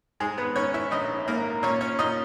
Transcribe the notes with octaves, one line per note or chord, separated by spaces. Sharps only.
G#2 G#3 G#4
B3 B4
G#2 C#4 C#5
E4 E5
A#1 D#4 D#5
G#2 A#3 A#4
A#2 C#4 C#5
C#4 C#5
A#2 D#4 D#5